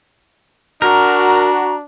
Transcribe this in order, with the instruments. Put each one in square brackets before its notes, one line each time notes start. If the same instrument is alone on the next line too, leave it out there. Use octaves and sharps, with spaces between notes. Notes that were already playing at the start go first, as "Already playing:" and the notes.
[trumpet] D4 [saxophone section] F#4 [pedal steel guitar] A#4 [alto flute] A#5